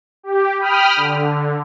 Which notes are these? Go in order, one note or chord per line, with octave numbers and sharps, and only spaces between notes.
G4
G5 B5 D#6 F6
D3